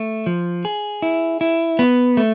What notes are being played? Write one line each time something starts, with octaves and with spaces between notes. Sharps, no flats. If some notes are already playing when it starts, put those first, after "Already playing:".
Already playing: A3
F3
G#4
E4
E4
B3
A3